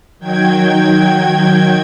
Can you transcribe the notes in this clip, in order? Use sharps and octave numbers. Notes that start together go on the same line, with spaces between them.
D#3 F#3 G5 G#6